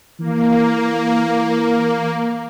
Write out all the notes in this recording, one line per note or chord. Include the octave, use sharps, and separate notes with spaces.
E3 A#3